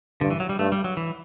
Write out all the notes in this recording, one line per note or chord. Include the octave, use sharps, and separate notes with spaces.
G2 D3
E3
F#3
G3
G2 A3
G3
F#3
E3